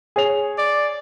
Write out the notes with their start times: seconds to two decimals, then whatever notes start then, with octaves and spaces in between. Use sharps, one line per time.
0.16 G#4 C#5 F7
0.58 D5